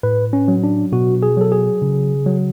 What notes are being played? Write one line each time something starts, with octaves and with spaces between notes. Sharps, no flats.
A2 B4
C#4
F#3
D4
B2 F#4
G#4
F#3 A4
G#4
C#3
F#3